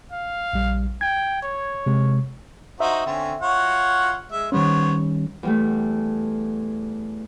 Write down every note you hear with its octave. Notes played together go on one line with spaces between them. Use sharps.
F5
A#1 G3
G5 G#6
C#5
C3 G#3
D#4 F#4 C5 E5
D3 C4 C#4
F4 C#5 F#5
G#3 E5
D#3 G3 B3 C#4 C5 C#5
E2 G3 A3